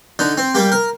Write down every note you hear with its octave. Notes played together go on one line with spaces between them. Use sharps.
D3 D#4
C4
G3 A#3 G4
A#4